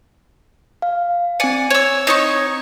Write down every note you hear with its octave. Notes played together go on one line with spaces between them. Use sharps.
F5
C4 D5 G#5 C#7
C#5 E6
D#4 C#5 C#6